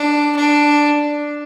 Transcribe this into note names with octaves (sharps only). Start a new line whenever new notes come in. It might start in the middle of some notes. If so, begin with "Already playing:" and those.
Already playing: D4
D4